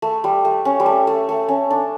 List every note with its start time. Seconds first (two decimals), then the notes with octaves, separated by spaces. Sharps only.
0.02 A3
0.24 G3
0.45 A3
0.65 C#4
0.80 G3
0.86 A3
1.07 A3
1.29 A3
1.48 C#4
1.70 D4